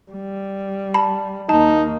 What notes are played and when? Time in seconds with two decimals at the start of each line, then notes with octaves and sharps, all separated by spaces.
0.11 G3
0.94 A5 B5
1.49 D#2 A#3 D#4 A5